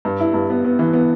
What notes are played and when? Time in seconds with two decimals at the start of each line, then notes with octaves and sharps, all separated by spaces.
0.05 G2
0.20 E4
0.34 G2
0.50 B3
0.65 B3
0.79 E3
0.93 B3